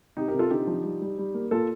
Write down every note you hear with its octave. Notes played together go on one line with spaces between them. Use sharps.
C3 D#4 G4
G4 A#4
C3
F4 A4
D3 D#4 G4
F3
G3
G3
G3
A#3
A#2 F4 A4